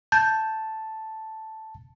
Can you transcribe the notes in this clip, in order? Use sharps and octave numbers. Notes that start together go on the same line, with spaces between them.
A5 G6